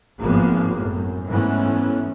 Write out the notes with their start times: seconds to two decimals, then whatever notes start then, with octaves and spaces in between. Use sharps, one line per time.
0.21 G#1 G#2 F3 A#3 B3
0.73 F#2 A2
1.28 G#2 E3 A3 B3 C#4